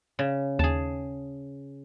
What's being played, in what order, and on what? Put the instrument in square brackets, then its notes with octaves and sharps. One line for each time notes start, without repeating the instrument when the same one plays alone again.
[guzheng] C#3
[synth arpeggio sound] D#2 [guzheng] G#4 A5